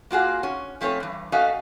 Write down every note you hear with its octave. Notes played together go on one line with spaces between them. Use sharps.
A#3 F4 F#4 G#4
C#4
F3 A3 C4 C#4 C#5
G2 E3
A3 C#4 F#4 D#5 F5